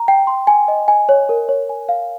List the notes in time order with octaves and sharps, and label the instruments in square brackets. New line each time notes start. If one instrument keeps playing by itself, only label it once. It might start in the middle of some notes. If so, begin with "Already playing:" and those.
Already playing: [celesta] A#5
G5
C6
G#5
D#5
G#5
C#5
A#4
C#5
G#5
F5